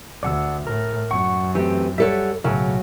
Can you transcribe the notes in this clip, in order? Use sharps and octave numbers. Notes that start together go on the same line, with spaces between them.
D2 D5 F#5 E6
A2 A#4
F#2 F#5 C#6
E3 A3 C4 G4
G3 A4 C#5 E5 F#5
B1 A2 C#3 F#3